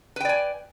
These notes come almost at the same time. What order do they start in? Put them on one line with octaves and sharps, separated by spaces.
B4 G5 D5 G#5